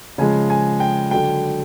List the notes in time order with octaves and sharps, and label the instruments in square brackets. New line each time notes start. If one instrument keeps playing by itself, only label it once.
[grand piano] C#3 F3 G#3 G#5
G#5
G5
D3 F#3 G5